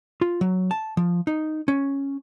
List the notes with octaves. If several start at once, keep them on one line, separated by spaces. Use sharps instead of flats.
F4
F#3
A5
F3
D#4
C#4